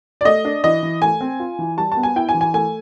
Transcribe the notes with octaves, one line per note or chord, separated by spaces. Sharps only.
D5
A3 D#5
D4
E3 D#5
E3
A3 G#5
C4
F4
E3
G3 A5
A5
B3
G#5
E4 G5
G#5
E3
G#5
A3 G#5